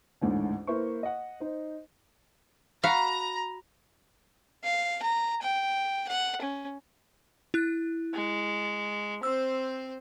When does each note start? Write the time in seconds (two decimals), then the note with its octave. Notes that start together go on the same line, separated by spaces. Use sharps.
0.21 A1 D2 G#2
0.67 A#3 E4 B4 C5 C#6
1.03 D#5 F#5
1.40 D#4 C5
2.83 F#4 F5 A#5 B5
4.64 F5
5.02 A#5
5.41 G5
6.08 F#5
6.41 C#4
7.54 E4 F#6
8.14 G#3
9.23 C4 C5 E6